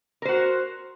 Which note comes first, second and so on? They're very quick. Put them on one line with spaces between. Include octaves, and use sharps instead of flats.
A#4 C5 F#4